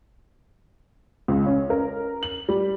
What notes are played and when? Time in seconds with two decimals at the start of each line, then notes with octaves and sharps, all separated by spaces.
1.28 C#2
1.46 C#4
1.70 A#4
2.23 F#7
2.49 G3